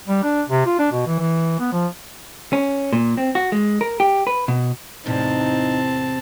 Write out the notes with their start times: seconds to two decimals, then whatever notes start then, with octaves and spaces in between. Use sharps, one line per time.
0.08 G3
0.23 D4
0.49 C3
0.66 F4
0.79 D4
0.92 B2
1.07 E3
1.19 E3
1.60 B3
1.73 F3
2.53 C#4
2.93 A#2
3.17 C4
3.35 F#4
3.52 G#3
3.81 A#4
4.00 G4
4.27 B4
4.48 B2
5.06 E2 A2 C3 C4 D#4 A5